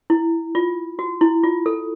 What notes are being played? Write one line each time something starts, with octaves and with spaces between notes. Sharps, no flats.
E4
F4
F#4
E4
F4
A4